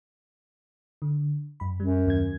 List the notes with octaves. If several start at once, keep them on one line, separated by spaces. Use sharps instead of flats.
D3
F#2 B5
F#2 G3
D#2 F#3 G#6